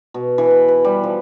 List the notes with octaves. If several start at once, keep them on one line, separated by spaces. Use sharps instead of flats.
B2
E3
B4
B4
G3
F3